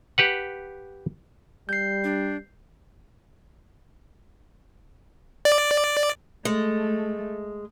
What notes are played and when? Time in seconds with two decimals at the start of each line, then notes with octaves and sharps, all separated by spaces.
0.18 G4 B4 F#5
1.69 G3 G6 C7
2.04 D4
5.45 D5
6.45 G#3 A3